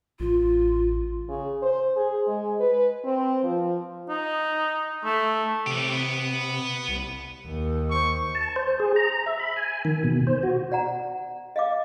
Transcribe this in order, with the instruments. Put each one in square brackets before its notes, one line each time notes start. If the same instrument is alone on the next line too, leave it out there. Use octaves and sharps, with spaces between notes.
[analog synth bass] A1 [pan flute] F4
[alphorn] C#3
C5
G#4
G#3
B4
C4
F3
[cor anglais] D#4
A3
[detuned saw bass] C3 [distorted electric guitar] E3 G4
[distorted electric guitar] B3
[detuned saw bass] C2
[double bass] D#2
[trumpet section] C5 C#6
[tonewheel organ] A5
C5
G#4
A#5
E5
B5
G#5
D#3
B2
C5
F#4
[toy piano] D5 F#5 A#5
D#5 F5 D6